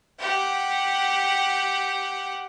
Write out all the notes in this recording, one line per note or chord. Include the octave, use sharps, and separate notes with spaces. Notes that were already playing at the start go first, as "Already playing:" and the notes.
G4 F#5